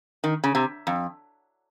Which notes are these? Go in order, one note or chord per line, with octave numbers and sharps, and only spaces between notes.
D#3
C#3
C3
F2